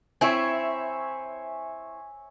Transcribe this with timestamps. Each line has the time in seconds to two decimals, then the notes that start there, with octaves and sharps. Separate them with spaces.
0.21 C4 E4 C#5 E5 G#5